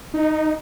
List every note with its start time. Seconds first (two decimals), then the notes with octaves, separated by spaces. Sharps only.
0.14 D#4